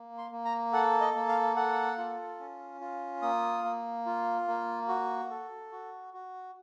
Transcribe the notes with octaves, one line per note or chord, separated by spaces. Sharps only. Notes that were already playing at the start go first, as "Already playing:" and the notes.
Already playing: A#3
C6
A#3
A#5
A4 F#5
D#5
A#3
F5
A4 F#5
F4
C#4
F4
A#3 D#6
A#3
F4
A#3
F#4
A4
F#4
F#4